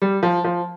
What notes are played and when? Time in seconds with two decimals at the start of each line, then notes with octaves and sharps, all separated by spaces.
0.02 G3
0.23 F3
0.44 F3